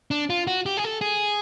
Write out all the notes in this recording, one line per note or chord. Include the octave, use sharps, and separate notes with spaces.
D4
F4
F#4
G4
G#4
A4
G#4